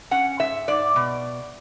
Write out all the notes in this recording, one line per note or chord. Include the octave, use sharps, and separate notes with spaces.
C#4 F#5
G#2 E5
G#2 D5
B2